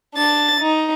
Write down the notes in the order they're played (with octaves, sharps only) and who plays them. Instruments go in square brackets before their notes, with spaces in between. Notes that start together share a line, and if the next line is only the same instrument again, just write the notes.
[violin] D4 A6
D#4